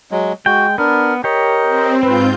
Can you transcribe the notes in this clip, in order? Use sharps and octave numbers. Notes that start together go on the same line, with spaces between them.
F#3 G#3
G#3 F#4 G5
B3 D4 A#4
G4 A#4 C#5 D#5
C4
G#2 C4 F4 B4 G6